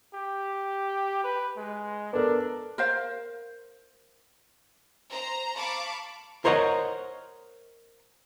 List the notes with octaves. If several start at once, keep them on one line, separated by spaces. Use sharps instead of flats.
G4
B4
G#3
B3 D4 A4 A#4
A#4 C5 F5
C5 A#5
F5 A5 B5 C#6 D6
A#4 C5 C#5 D#5 F#5 A#5